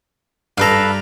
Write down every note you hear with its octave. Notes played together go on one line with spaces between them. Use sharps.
G2 A4 B4 F5 A#5